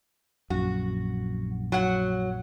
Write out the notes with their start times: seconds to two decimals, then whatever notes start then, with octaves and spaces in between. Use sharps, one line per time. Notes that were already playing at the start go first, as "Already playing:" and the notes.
0.50 A#1 F#2 F#4
1.72 F#3 F#5